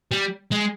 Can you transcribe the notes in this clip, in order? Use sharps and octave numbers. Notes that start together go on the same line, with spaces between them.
G3
G#3